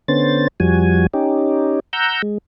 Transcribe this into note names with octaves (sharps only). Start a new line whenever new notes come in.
D3 B3 C#4 C5 A6
F2 F3 G3 F#4 G#5
C#4 D#4 G4
F#5 A#5 E6 G6
G#3